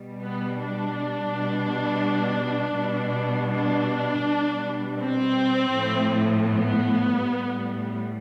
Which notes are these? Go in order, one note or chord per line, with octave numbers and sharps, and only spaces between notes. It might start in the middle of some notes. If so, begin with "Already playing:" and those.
Already playing: B2 G3
B3
D4
B2 G3
B2 G3
D4
B2 G3
C4
A2 F3
B3
A2 G3